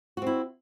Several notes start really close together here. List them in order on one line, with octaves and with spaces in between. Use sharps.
F#4 C4 E4